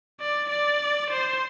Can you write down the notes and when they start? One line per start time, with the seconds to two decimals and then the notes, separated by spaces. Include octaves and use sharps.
0.21 D5
0.50 D5
1.11 C5